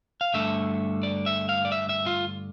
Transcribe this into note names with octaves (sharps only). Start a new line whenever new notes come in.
F5
G2 D3 A3 E5
D5
E5
F5
D5
E5
E5
F4